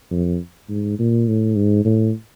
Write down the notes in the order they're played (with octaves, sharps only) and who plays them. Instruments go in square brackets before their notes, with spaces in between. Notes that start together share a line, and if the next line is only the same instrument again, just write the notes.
[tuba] F2
G#2
A#2
A2
G#2
A2